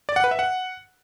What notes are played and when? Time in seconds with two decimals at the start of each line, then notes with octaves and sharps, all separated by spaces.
0.09 D5
0.16 F#5
0.24 B4
0.31 E5
0.39 F#5